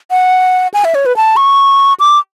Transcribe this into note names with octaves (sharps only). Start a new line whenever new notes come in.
F#5
G#5
E5
C#5
B4
A5
C#6
D6